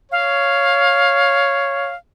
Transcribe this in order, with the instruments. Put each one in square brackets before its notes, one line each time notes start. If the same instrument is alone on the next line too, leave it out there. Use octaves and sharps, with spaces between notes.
[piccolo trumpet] C#5 [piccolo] F5